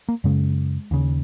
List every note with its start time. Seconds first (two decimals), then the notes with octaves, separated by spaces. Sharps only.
0.09 A#3
0.24 F#2 C#3 G#3
0.91 D#2 C#3